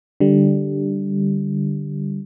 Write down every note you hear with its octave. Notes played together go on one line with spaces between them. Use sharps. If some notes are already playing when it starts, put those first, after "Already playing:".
D3 G3